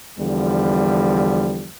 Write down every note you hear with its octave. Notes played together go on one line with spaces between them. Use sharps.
E2 D3 F3 G3